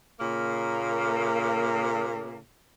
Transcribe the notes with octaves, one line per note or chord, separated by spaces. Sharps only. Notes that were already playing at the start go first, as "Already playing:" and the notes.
A#2 C#3 A#3